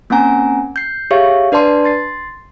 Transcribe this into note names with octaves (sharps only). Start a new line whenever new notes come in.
A#3 C4 C#4 F#5 G#5 A#5
G6 C7
G4 G#4 C#5 E5 F5 C#6
D4 B4 D5 A5 C6
C6 A6 C7